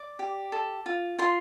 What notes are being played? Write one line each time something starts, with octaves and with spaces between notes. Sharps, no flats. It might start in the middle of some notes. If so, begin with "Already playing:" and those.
Already playing: D5 D6
G4
A4
F4
F4 C6